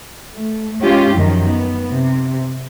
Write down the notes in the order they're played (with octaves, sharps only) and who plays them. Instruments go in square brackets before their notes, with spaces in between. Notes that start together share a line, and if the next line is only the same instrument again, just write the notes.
[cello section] A3
G#3 C#4 F4 G4
F#2 D#3 F3
B3
C3